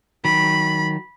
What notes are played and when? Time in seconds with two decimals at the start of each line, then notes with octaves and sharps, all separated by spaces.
0.25 D#3 F#3 B5